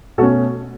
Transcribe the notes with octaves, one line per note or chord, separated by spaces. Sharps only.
B2 A3 C#4 F#4 A4